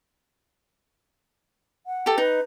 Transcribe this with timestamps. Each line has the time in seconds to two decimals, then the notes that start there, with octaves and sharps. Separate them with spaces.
1.86 F#5
2.06 G4 A4
2.18 D#4 B4